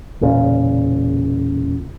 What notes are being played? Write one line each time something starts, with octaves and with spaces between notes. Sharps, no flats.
E1 A#2 C#3